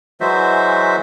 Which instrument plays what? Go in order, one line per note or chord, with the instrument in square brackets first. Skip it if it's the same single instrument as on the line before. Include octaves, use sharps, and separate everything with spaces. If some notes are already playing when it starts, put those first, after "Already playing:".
[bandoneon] E3 F#3 G#3 F#4 C5 E5